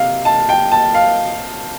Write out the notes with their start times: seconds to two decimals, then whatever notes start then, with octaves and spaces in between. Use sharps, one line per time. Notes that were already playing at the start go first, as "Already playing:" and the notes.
Already playing: C3 F5
0.25 A5
0.49 G5
0.72 A5
0.94 F5